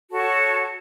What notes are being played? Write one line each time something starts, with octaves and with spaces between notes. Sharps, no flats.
F#4 A4 C#5 A5